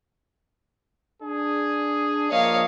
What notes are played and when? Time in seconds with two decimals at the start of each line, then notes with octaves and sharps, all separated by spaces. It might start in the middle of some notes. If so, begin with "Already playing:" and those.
1.22 D4 G#4
2.30 F3 A#3 C#5 D#5 F5